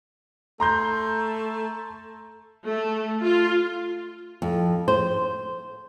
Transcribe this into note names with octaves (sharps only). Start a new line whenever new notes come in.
A3 A#5 C6 G6
A3
F4
F2
C5